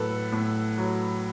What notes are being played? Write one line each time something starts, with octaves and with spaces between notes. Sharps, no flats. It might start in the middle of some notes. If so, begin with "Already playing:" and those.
Already playing: A2 F#3 A4 B4
A2
F#3